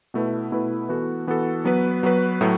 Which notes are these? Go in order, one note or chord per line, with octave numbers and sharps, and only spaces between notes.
B2 A3 E4 B4
B2 A3 E4 B4
E3 B3 F#4 A4
E3 B3 F#4 A4
F#3 B3 F#4 B4
F#3 B3 F#4 B4
A2 F#3 A3